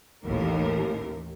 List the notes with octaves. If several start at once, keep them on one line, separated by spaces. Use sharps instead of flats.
A1 D#2 A2 A#4